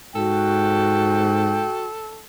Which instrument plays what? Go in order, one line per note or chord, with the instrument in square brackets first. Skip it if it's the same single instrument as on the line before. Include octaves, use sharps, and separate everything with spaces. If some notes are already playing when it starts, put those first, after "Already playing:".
[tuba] G#2 [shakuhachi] F#4 [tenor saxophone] A4 [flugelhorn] G5